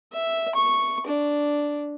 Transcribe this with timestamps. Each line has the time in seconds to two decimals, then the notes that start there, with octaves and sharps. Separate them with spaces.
0.12 E5
0.55 C#6
1.07 D4